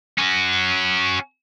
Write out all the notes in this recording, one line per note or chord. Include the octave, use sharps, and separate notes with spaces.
C#4 F#4